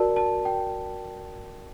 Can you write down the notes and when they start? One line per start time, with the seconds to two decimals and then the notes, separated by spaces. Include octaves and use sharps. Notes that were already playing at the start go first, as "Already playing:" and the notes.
Already playing: F#4 A#4 D5 A5
0.16 A5
0.45 G5